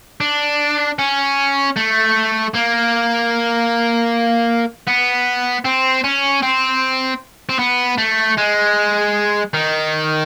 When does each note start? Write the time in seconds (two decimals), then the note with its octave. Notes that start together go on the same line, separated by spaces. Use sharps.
0.21 D4
0.99 C#4
1.77 A3
2.54 A#3
4.88 B3
5.65 C4
6.04 C#4
6.42 C4
7.49 C4
7.59 B3
7.98 A3
8.37 G#3
9.54 D#3